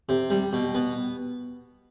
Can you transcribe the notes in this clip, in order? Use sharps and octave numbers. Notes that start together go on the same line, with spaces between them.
C3
G3
B2
B3